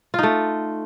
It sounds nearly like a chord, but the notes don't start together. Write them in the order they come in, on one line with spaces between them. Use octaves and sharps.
F4 D#4 A3